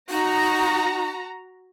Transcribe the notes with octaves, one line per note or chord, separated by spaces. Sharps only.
D#4 F#4 A#5